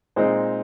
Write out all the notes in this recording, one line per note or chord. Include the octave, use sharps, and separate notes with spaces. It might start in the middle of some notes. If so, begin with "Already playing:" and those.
A#2 G#3 C4 D#4 C5